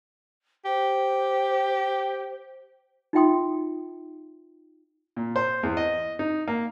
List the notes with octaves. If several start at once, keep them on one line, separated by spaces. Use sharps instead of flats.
G4 C5
D#4 F4 E5 G5 C6 D#6
A#2
C5
E2
D#5
D#4
A#3